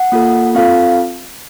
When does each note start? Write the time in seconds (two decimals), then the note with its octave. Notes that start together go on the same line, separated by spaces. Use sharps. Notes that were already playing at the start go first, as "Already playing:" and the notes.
Already playing: F#5
0.12 A#3 F4 A4
0.55 C4 F4 A4 F5